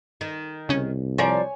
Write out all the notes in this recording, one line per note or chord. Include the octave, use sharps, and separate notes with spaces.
D#3
C2 C#3 C#4
F3 A#4 C#5 D5 G#5